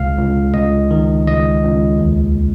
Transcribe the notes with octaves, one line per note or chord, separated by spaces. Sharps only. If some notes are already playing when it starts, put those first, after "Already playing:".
Already playing: C#2 F5
C#2
C#2 D#5
D#3
C#2 D#5
C#2
D#2